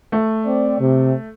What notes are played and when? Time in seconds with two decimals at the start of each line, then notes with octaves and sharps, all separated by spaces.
0.12 A3
0.46 C4 D5
0.80 C3